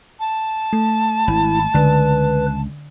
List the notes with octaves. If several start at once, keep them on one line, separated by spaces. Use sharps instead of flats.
A5
A3
G#1 E4
C#2 D3 B4